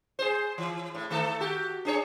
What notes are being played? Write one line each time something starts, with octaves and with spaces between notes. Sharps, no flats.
G#4 C5
E3
A2
D#3 A3 A4
F#4 G4
D4 G#4 C#5